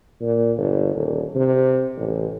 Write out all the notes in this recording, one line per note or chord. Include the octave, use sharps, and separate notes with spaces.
A#2
G1
D#1
C3
A1